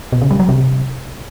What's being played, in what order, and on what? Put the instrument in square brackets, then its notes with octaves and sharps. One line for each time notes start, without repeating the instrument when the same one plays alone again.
[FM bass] B2
C#3
G3
F#3
C3